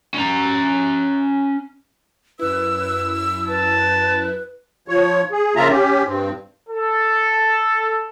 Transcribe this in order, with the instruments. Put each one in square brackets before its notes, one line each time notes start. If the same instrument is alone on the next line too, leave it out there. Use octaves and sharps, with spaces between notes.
[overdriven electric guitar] C#4 A#5
[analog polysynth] F#2 E4 [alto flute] B4 [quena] E6
[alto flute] B4 [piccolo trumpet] A5
[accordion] F3 C#5
G#4
C#3 F3 A#3 F4 E5 A#5
C#4 G4
G2 C4
[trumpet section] A4